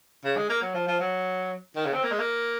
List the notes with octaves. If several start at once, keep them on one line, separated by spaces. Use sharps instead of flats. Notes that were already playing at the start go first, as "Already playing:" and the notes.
C#3
G#3
A#3
F#3
F3
F3
F#3
D#3
C#3
C4
A#3
G#3
A#3